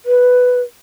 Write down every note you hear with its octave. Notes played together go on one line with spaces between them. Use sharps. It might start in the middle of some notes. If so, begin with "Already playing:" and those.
B4